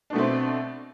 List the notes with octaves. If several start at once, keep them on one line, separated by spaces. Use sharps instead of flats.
B2 A3 C4 D4